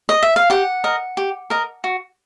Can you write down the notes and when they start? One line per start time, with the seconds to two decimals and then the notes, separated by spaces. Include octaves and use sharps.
0.09 D#5
0.23 E5
0.36 F5
0.50 G4 F#5
0.84 A#4 D#5
1.17 G4
1.50 A#4 D#5
1.84 F#4